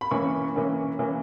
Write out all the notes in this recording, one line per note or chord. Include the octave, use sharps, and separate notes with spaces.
B5
E3 A#3 C#4 C#6
E3 A#3 C#4
E3 A#3 C#4